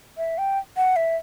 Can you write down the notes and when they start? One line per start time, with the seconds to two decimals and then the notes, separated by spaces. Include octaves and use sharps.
0.17 E5
0.38 G5
0.77 F#5
0.96 E5